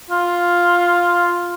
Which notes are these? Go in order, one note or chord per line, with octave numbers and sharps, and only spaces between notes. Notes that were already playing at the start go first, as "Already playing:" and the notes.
F4